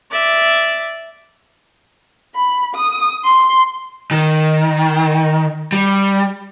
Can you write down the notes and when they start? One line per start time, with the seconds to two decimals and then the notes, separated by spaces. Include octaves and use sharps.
0.11 D5 E5
2.35 B5
2.75 D#6
3.25 C6
4.11 D#3
5.72 G3